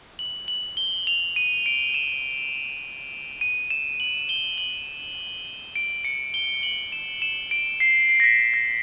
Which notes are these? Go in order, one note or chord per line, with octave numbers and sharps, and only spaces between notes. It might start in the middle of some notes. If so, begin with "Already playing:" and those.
F#7
F#7
G7
F7
D#7
D7
E7
D#7
E7
F#7
G7
F#7
D7
C#7
G7
F#7
E7
E7
D7
C7
C7
A#6
B6
A#6